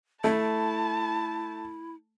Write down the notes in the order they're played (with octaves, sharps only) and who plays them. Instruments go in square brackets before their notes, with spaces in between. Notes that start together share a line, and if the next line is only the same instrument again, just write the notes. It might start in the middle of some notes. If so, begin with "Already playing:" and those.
[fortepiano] A3 [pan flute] E4 [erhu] A5